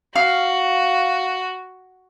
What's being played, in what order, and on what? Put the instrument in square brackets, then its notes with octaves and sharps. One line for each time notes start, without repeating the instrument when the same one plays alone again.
[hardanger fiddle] F#4 [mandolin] F5